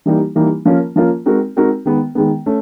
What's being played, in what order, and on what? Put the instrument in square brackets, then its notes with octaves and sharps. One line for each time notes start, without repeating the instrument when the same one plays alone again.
[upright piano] E3 G3 A#3 D#4
E3 G3 A#3 D#4
F3 A#3 C#4 F4 A#4
F3 A#3 C#4 F4 A#4
G#3 C4 D#4 F#4 A#4
G#3 C4 D#4 F#4 A#4
D#3 G#3 B3
D#3 G#3 B3
A3 C#4